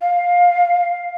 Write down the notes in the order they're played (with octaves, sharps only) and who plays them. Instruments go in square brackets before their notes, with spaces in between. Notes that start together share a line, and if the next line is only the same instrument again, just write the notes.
[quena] F5